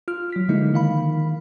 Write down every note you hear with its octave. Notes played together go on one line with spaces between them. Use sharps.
F4 F6
F#3 B6
D3 F3 G#3 A#3 D#4 E4
D#3 F5 B5